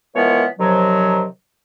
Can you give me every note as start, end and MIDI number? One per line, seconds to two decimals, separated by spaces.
0.15 0.45 52
0.15 0.45 53
0.15 0.45 56
0.15 0.45 59
0.15 0.45 70
0.15 0.45 73
0.59 1.25 48
0.59 1.25 51
0.59 1.25 53
0.59 1.25 54